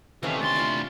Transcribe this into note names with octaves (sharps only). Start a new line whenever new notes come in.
C3 D#3 E3 A3 C#4 F5
D2 C6 A6
F4 D5 E5